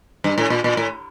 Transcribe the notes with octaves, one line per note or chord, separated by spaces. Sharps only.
G2
A2
A#2
A#2
A2